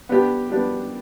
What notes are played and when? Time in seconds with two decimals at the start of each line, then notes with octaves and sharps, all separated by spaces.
0.09 B3 D4 G4
0.50 B3 D4 G4